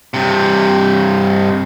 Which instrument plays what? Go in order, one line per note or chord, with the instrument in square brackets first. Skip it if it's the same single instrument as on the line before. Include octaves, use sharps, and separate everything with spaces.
[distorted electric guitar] G2 C3